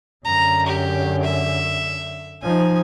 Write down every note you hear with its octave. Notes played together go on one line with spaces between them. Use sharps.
F#2 D3 A#5
G4
E5
F3 D#4 G#5